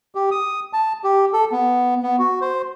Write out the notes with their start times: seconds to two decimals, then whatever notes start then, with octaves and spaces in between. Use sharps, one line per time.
0.15 G4
0.31 D#6
0.73 A5
1.04 G4
1.33 A4
1.52 B3
2.03 B3
2.19 F#4
2.41 C5